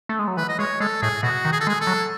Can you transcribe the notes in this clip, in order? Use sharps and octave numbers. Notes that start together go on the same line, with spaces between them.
A3
G#3
F#3
E3 B4
D#5
G#3 C#5
G#3 A4
A2 G#4
B2 F#4
D#3
G#4
A4
G#3 G#4
A4
F#3